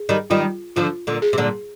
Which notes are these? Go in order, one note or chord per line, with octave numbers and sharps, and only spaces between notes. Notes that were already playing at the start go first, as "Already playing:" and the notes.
Already playing: G#4
D#3 G3
D#3 G3 F4
D3 F3 F4
A#2 D3
G#4
C3
A#2 D3